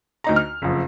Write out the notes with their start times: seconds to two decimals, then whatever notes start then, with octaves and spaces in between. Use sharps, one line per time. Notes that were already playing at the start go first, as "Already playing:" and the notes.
0.24 D2 D#4 A#5
0.36 F6
0.62 F#1 F2